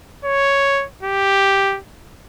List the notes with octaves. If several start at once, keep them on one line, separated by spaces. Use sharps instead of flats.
C#5
G4